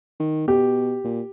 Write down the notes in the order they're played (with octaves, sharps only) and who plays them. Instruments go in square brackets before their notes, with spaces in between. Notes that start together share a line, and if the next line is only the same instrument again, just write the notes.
[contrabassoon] D#3
[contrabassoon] B2 [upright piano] G4
[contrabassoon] A#2